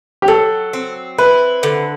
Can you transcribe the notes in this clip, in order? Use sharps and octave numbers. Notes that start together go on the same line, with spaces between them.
G4
F#3 A4
C4
E4 B4
D3